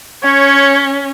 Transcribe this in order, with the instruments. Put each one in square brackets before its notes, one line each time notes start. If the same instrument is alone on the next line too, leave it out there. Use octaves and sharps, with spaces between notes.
[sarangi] C#4 [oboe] C#5